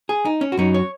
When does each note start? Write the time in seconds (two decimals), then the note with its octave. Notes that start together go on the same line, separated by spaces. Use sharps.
0.09 G#4
0.25 D#4
0.41 C#4
0.52 F#4
0.57 F#2 F#3 C#4 D#4
0.74 C#5